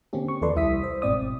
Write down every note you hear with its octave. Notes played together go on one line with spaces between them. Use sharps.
D3 A#3 C4 C#4 G4
C#6
D#2 F3 A4 B4 D5 C6
C2 G3 E4 E5 D#6 B6
C5
G1 G#2 B2 C4 D5 D#6